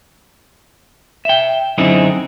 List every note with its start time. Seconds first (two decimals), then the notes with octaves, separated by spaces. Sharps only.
1.25 E5 G5
1.78 F#2 D3 C4 D#4 E4 G#4